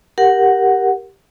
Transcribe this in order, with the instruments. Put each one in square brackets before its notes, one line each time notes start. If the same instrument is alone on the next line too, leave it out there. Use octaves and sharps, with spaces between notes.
[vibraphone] G4 A#4 F#5